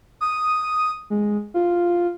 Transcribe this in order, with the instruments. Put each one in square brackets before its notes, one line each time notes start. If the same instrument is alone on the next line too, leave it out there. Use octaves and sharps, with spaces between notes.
[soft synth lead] D#6
G#3
F4